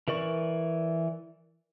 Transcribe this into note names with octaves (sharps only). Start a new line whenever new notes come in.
E3 A#4 D5 C#6